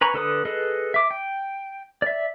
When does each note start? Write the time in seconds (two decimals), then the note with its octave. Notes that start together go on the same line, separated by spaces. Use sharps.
0.01 B4 G#5 A#5 C#6
0.14 D3 A4 B4 D#6
0.45 G#4 A4 B4 D#5
0.94 E5 D6
1.11 G5
2.02 D5 E5